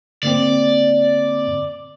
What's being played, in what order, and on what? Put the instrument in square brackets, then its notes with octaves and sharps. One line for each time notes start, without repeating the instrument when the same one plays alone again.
[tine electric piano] D3 A#3 C4 [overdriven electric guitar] D5